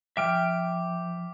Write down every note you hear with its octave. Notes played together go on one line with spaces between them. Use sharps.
F3 E5 G5 D6 F6